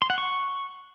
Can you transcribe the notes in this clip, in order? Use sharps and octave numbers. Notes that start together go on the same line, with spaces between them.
C6
F#5
C#6